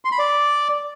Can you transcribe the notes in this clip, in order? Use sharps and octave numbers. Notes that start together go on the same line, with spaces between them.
C6
B5
D5